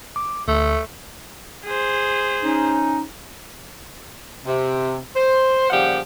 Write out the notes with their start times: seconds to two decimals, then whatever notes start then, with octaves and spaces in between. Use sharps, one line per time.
0.16 D6
0.48 D2 A3
1.65 G#4 C5
2.43 C#4 D#4
4.46 C3
5.16 C5
5.70 A#2 C#3 F3 G3 G4 F#5